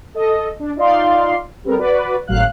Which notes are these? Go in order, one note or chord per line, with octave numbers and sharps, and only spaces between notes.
A4 D#5
D4
D#4 F4 D5 F5 C6
G3 B3 C4 A4 A#4
F#4 B4 D5
G#1 A2 F#3 F5 F#6